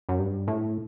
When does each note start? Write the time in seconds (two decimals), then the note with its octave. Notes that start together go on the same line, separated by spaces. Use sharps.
0.09 F#2
0.19 G2
0.48 A2